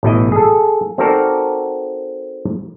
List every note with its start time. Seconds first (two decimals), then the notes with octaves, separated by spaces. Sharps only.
0.03 A1 B2 E3 D#5
0.32 G#4 A4
0.98 C4 D#4 F#4 A4 A#4 D5